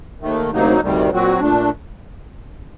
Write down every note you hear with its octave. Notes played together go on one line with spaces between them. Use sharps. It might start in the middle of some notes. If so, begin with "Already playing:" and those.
D#2 D#3 A3
D2 C3 F#3 A#3 D#4
D2 C3 D#3 G3
A#2 F#3 C4 F#4
A#2 A3 D4